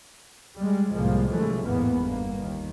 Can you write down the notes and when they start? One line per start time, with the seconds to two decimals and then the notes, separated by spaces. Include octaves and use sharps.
0.59 G3 G#3
0.92 C2 F2 A2 F3 G#3 A#3
1.32 G2 C3 E3 F#3 G#3 A3
1.65 A1 E2 G#2 E3 A#3 B3
1.97 G1 A#3
2.40 D#2 D#3